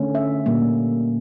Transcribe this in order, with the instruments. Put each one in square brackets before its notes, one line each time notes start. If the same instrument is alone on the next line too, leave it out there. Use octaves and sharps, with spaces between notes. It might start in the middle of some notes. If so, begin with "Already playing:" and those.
Already playing: [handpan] D3 A3 C#4
E5
A#2 G3 A#3